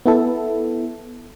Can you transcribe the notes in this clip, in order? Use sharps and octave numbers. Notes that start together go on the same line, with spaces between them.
B3 E4 A4